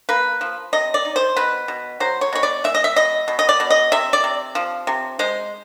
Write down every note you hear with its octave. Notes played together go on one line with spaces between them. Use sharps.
A#3 B4
F3
C3 D#5
D5
D#4
C5
B2 B4
B2
F#3 C5
C#5
B2 C#5
D5
G#3 E5
D#5
E5
B2 D#5
B2
D#5
D5
B2
D#5
C3 E5
D5
C3
F3
C3
G#3 C5